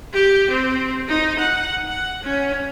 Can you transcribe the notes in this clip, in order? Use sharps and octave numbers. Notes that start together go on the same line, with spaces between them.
G4
C4
D#4
F#5
F#5
C#4